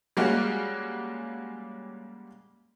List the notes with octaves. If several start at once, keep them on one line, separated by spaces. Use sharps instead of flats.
G3 G#3 A#3 C#4 F#4